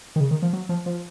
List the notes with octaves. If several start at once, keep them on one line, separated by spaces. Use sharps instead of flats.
D#3
C#3
D#3
F3
F#3
F3
F3